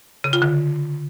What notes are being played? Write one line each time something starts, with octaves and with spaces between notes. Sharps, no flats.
C#3
F4
D3